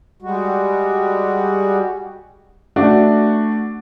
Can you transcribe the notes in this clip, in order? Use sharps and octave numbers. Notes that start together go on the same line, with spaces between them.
G3 G#3 F#4
A3 D4 F#4